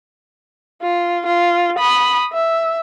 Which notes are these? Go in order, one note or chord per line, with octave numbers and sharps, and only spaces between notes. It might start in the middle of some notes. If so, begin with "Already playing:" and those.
F4
F4
B5 D#6
E5